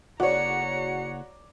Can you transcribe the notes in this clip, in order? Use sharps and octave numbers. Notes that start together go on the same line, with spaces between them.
F#1 F#4 C#5 D5 A#5 C#7